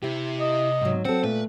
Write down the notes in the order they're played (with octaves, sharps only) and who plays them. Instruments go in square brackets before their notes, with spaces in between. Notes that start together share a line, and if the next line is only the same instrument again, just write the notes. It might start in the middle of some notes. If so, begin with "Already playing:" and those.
[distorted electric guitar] C3 [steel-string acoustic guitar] E4 G4
[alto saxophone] D#5
[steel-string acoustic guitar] G#2 F#3
[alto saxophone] F#3 [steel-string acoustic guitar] C4 A4 [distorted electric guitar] F#5
[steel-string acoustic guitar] A#2 [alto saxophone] A3 [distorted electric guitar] B4